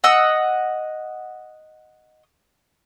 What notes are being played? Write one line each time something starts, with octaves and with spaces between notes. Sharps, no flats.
D#5 F#5 E6